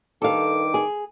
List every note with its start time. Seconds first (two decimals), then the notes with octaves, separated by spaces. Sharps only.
0.22 G2 D#3 A4 F5 D6
0.74 G#4